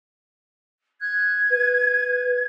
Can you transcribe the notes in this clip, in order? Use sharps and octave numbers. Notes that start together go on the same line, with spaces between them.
F#6 G#6
B4